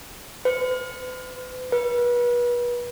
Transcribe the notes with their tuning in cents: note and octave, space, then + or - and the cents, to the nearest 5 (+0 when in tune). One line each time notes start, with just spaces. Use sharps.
B4 +45
B4 -35